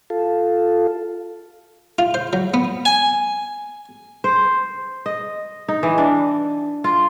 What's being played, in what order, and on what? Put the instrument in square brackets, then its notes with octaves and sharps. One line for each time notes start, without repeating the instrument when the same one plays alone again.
[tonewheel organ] F4 A4
[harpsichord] F4
C5
F#3
B3
G#5
[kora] C5
D#5
D#4
E3
D4
F4